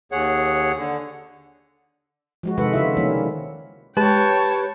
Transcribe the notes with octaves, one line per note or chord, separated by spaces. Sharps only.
D#2 G#4 C#5 F#5
D3
F3 G#3 F#4
C3 D#3 G#3 A4 B4 F#5
C#3 E4 F4 E5
D#3 F3 G3 A#3 C#4
G#3 G4 B4 C#5 G5 A5